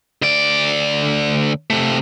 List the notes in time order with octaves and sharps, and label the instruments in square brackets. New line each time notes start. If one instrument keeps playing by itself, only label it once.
[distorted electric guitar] D2 D5
C3 A3